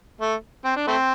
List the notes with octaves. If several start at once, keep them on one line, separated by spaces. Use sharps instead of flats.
A3
C4
D4
A3 C4